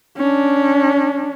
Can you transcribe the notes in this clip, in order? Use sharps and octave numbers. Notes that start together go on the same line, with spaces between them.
C#4 D4